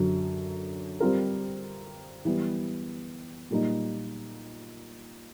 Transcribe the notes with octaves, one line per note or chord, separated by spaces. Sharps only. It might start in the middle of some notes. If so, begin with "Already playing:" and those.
Already playing: F#2 D3 F#3
G3 C4 F4 A#4
E3 G3 B3
A#2 G3 A#3 D#4